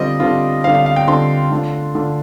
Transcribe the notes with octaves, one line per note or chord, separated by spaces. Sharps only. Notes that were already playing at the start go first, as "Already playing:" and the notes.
Already playing: D3 G3 C4 F4 D#5
D3 G3 C4 F4
D3 G3 C4 F4 F5
F5
F5
G5
D3 G3 C4 F4 C6
D3 A3 D4 F4
D3 A3 D4 F4